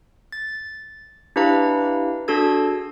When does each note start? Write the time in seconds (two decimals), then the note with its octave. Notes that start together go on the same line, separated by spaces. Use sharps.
0.32 A6
1.36 D4 E4 G4 B4 F5 A#5
2.28 D4 F#4 G#4 A4 E6 G#6